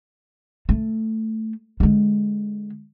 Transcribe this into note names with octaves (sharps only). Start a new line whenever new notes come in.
A3
D3 G#3